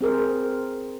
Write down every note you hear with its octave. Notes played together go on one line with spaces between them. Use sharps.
C4 G#4 A#4 C5